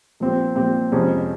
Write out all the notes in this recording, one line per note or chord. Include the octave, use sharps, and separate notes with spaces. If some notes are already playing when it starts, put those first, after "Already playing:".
A#2 F3 C4 G4
A#2 F3 C4 G4
F2 C3 F3 G#3 C#4